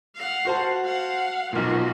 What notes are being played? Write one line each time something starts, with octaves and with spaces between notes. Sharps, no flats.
F5 F#5
F#4 C5 A5
F5 F#5
B1 A#2 F3 F#4